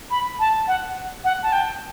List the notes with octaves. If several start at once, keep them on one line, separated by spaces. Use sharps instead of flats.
B5
A5
F#5
F#5
A5
G5